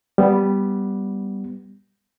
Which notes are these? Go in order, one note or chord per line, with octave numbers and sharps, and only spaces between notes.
G3 B3